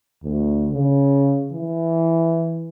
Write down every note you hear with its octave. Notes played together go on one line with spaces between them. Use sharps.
D2
C#3
E3